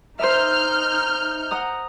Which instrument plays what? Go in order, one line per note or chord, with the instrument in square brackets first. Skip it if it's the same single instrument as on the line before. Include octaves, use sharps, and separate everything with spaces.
[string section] D#4 F6 G6 [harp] C5 E5
[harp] F#5 A#5 D#6